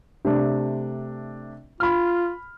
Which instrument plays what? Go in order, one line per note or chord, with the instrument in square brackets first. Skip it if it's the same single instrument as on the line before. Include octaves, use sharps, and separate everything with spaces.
[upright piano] C3 A3 D4
[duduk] F4 [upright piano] B5 F6